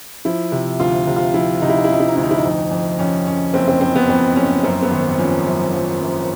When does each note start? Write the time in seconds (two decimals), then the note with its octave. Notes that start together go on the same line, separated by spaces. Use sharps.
0.25 F3 E4
0.52 C3
0.80 D2 F4
1.07 C3
1.16 F4
1.34 F3 E4
1.62 C3 D#4
1.69 E4
1.78 D#4
1.84 E4
1.89 F3 D#4
2.00 E4
2.08 D#4
2.15 D2 E4
2.23 D#4
2.31 E4
2.38 D#4
2.44 F2
2.71 F2
2.99 F2 C#4
3.27 F2 C#4
3.54 F#1 C4
3.68 C4
3.81 F2 C4
3.96 B3
4.09 F2 C4
4.36 F#1 C#4
4.63 F#2 C4
4.82 B3
4.91 G#1
5.18 F3 C#4
5.47 F#2
5.74 F3
6.01 F#2